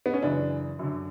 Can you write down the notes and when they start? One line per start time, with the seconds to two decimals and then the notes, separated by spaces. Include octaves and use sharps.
0.06 B3
0.14 C#4
0.22 F#2 C#3 E3 D4
0.79 F#2 D3